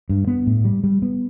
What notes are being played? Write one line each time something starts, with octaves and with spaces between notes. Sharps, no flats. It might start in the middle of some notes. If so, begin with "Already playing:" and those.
G2
B3
A2
G3
G3
B3